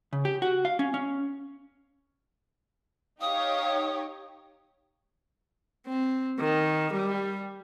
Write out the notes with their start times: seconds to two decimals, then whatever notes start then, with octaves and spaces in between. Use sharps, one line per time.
0.13 C#3
0.25 G4
0.42 F#4
0.65 F5
0.79 C#4
0.94 C#4
3.21 D#4 G4 C#5 F5 D#6
5.87 C4
6.39 D#3
6.93 G3